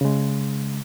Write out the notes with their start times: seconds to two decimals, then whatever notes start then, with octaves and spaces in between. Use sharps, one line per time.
0.01 C#3 G#3